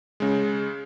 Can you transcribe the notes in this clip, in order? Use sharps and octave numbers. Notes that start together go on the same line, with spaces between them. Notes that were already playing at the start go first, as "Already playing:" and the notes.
C#3 G#3